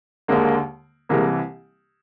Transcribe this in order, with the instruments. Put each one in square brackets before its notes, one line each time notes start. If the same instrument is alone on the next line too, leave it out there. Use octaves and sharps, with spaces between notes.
[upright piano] D#2 D3 G#3 A#3
C2 C3 E3 G#3 A#3